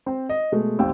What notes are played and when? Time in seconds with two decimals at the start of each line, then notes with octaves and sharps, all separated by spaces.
0.06 C4 C5
0.29 D#5
0.52 B2 G#3 A3
0.79 G#1 D#2 F5 G5 E6